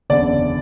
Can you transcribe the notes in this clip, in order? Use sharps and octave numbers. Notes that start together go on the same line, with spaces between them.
F#1 E2 D3 D5